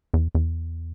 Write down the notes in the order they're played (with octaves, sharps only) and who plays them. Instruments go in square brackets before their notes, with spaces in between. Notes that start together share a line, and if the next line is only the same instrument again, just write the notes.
[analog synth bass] E2
E2